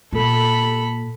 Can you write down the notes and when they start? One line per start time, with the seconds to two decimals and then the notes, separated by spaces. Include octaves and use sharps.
0.13 A#2 A4 B5